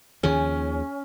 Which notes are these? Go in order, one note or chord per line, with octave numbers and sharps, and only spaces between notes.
D#2 D#3 F3 C#4 G#4